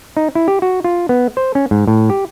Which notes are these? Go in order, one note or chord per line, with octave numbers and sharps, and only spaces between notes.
D#4
E4
G4
F#4
F4
B3
C5
C#4
G#2
A2
G4